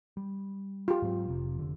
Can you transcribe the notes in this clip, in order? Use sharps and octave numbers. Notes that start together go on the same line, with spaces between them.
G3
F4 G4
G#2 F#3 C4
F1 C3
F1 D3